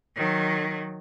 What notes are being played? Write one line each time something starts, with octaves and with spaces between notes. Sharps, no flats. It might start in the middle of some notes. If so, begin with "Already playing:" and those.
D#3 F#3